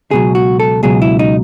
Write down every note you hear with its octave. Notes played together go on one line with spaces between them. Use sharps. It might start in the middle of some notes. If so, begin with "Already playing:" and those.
C#2 B2 F#3 G#4
F#4
A4
C#2 B2 F#3 G#4
E4
D#4